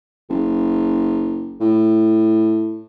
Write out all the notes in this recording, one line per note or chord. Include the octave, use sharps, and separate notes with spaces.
F#1
A2